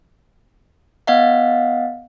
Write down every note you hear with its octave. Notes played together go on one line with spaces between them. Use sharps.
B3 D#5 F5 F#5